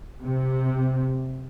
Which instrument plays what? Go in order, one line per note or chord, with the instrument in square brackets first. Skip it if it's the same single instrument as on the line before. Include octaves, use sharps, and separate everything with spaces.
[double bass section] C3